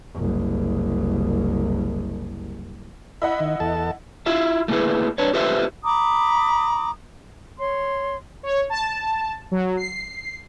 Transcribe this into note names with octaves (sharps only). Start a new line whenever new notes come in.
F#1 C2
E4 D#5 F#5 B5
D#3
E2 A4 A5
E4 F4 E5 F5
A3 A#3 E4 G#4 B4
D4 B4 C#5
F4 G4 A4 B4 C5 E5
A#5 B5 D6 D#6
C#5 C6
C#5
A5
F#3
C7